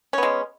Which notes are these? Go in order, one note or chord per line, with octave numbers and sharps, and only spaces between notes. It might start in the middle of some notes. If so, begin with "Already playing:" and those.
G#3 B3 C#4